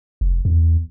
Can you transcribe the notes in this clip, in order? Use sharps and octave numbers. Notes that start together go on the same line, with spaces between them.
F1
E2